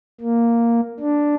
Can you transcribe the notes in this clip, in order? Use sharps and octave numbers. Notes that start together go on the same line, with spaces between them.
A#3
D4